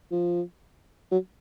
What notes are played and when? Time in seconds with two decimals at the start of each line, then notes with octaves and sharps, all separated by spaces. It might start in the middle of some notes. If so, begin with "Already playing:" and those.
0.11 F3
1.12 F#3